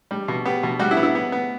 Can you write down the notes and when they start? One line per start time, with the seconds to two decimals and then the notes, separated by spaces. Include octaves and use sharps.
0.11 G3
0.28 B2
0.45 B3 G4
0.63 B2
0.79 G3 F#4
0.91 E4
0.97 B3
1.03 E4
1.15 B3
1.32 B3